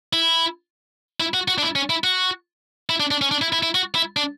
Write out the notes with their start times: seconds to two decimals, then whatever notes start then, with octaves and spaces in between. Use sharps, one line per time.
0.13 E4
1.20 E4
1.34 F#4
1.48 F#4
1.58 D4
1.62 E4
1.76 C#4
1.90 E4
2.04 F#4
2.89 E4
3.00 D4
3.11 D4
3.22 C#4
3.31 D4
3.42 E4
3.53 E4
3.63 E4
3.75 F#4
3.95 E4
4.17 D4